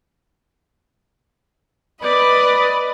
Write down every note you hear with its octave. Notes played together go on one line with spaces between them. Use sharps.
B4 D5 D#5 B5